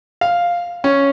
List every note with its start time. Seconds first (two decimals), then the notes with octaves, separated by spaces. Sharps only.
0.21 F5
0.84 C#4